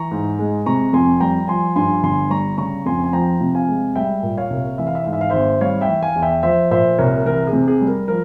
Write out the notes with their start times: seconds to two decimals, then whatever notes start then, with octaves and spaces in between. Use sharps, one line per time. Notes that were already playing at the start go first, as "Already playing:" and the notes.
Already playing: E3 A#5 C#6
0.11 G#2
0.39 G#3
0.66 C3 A#5 C#6
0.93 F2 G#5 C6
1.20 G3 G5 A#5
1.48 F3 G#5 C6
1.76 G2 G#5 C6
2.03 G1 G#5 C6
2.30 G3 A#5 C#6
2.58 C#3 A#5 C#6
2.85 F2 G#5 C6
3.04 G#5
3.13 F3 G5 A#5
3.41 C3
3.55 F5 G#5
3.68 G#3
3.95 G3 E5 G5
4.23 A#2
4.37 C#5 F5
4.50 C2
4.78 E3 E5
4.87 F5
4.95 E5
5.04 G#2 F5
5.13 E5
5.21 F5
5.30 G#1 C5 E5
5.61 G3 C#5 F5
5.81 E5 G5
5.89 E3
6.03 F5 G#5
6.16 E2
6.22 E5 G5
6.43 F3 C5 E5
6.71 A#2 C5 E5
6.98 C2 A#4 C#5
7.25 E3 A#4
7.47 G#4
7.53 C3
7.68 G#4
7.81 G3
7.88 A#4
8.08 F3 A#4